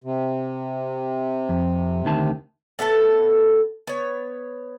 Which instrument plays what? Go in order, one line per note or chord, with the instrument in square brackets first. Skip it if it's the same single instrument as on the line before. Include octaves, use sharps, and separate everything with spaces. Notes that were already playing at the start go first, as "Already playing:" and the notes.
[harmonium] C3
[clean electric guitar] F2
D2 D#3 A5
[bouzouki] A2 B3 A4 A5
B3 C#5